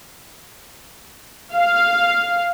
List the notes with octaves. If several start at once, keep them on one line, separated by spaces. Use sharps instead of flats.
F5